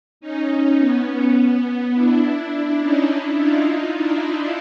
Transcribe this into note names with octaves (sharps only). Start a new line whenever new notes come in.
C#4 D#4
B3 C#4
B3
B3
D4 E4
D4 E4
C#4 D#4
D4 E4
D#4 F4
D#4 F4
D4 E4